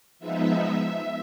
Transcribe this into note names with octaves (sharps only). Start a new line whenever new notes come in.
F3 G#3 B3 D#4 E5